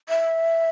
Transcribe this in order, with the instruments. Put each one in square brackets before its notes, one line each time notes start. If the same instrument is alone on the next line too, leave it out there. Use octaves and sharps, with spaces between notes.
[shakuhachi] E5